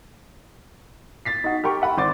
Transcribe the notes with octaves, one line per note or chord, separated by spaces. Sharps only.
A6 B6 C7
D#4 F#4
G4 A#4 G5 C#6
E5 F#5 B5
G#1 C5 C6 D6 A6